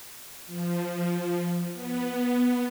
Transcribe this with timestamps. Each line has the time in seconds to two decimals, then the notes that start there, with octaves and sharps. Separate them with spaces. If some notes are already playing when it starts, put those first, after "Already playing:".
0.47 F3
1.73 B3